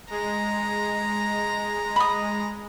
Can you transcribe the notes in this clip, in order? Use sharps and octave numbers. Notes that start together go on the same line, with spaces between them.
G#3 A#5
B5 D#6